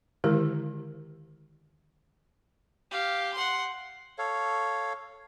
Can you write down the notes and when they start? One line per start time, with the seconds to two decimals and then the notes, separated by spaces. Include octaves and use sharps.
0.24 D3 D#3 G#3 E4 G4 A#4
2.91 G4 F5
3.34 F#5 C6
4.18 A4 C#5 F5